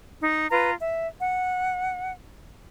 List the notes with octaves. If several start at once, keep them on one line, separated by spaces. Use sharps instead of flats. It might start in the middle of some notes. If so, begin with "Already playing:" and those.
D#4
F4 B4 A#5
E5
F#5